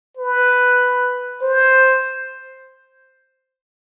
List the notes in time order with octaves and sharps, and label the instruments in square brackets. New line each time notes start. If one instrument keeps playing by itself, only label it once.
[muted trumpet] B4
C5